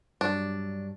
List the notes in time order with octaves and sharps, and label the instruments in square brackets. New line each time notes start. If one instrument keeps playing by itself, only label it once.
[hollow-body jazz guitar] G2 F#3 G3 [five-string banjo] D4